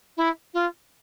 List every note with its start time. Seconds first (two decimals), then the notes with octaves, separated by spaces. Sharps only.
0.17 E4
0.54 F4